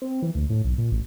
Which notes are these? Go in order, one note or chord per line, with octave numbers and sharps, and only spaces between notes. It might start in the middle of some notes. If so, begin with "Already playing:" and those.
C4
E3
D2
A2
B1
A#2
A1